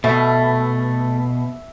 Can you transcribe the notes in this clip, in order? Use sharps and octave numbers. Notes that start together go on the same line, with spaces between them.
B2 A3 E5